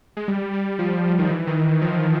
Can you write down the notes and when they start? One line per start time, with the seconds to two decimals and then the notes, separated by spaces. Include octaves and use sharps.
0.17 G#3
0.28 G3
0.53 G3
0.79 F3
1.19 D#3
1.30 E3
1.47 D#3
1.82 F3